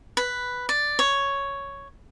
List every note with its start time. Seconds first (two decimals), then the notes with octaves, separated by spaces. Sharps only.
0.17 B4
0.69 D5
0.99 C#5